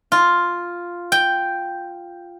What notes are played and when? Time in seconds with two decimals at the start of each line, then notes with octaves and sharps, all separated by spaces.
0.12 F4
1.12 G5